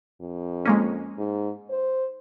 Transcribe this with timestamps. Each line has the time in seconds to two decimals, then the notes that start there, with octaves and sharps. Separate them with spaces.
0.21 F2
0.65 G#3 A#3 C#4
1.18 G#2
1.70 C5